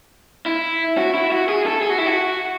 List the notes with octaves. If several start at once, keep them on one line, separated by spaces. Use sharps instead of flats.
E4
F#4
E4
F#4
G#4
A4
G#4
F#4
E4
F#4